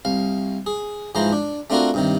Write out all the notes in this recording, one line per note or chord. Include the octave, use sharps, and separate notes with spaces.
C2 F5
G#4
G#2 E3 F3 C5 A#5
D4
A3 C4 D4 F4 F#4 A#4
G2 C3 D#3